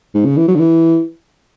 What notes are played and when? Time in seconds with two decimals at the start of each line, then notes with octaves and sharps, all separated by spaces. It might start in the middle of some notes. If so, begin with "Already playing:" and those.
0.14 G#2
0.25 C#3
0.37 E3
0.48 F#3
0.55 D3
0.59 E3